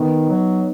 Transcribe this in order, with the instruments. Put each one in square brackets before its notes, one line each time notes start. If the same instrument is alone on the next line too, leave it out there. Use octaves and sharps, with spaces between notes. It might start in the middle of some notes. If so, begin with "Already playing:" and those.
Already playing: [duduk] D#3 [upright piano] B3 D#4
[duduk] F#3